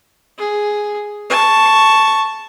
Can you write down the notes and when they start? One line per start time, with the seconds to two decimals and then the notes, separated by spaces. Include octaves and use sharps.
0.38 G#4
1.30 A5 C#6